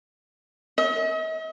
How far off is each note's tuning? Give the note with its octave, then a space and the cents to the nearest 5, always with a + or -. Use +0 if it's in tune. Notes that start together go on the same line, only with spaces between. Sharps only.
D#5 +45